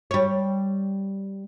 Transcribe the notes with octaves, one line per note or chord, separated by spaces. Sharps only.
G3 C#5